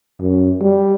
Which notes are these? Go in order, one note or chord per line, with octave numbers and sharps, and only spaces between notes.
F#2
G3